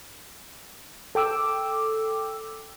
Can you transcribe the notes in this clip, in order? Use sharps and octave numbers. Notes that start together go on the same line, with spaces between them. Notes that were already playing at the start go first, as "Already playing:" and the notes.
A4 G5 D6 E6